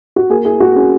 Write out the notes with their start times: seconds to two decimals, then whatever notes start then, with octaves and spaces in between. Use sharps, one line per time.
0.16 F#4
0.29 A#3 G#4
0.45 E4 G#4
0.60 E4 F#4
0.76 C#4 G#4